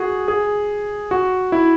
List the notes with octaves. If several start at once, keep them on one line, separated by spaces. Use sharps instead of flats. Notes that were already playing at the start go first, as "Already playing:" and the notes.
Already playing: F#4 G#4
G#4
F#4
E4